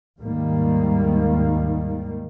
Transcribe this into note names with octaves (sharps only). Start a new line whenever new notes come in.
D#2 G#2 D#3 G3 A#3